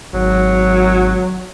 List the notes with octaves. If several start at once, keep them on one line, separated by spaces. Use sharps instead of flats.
G#1 F#3